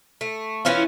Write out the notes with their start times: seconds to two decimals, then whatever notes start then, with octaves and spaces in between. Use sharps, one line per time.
0.21 A3
0.65 E3 C#4 E4 F4